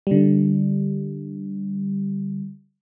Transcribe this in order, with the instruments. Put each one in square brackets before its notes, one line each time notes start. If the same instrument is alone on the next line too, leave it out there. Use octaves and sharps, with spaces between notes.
[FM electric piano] D3 G3